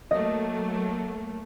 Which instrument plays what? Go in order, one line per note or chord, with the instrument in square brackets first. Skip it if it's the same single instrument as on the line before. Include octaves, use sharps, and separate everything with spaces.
[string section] F#3 A3 A#3 [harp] D#5